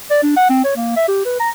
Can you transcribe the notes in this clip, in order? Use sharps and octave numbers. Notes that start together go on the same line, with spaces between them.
D5
D4
F#5
C4
C#5
A#3
E5
G4
B4
A#5